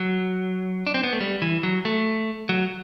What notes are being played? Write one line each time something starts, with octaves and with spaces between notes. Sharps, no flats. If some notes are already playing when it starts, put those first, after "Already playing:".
Already playing: F#3
D4
C4
B3
A3
G3
E3
F#3
A3
F#3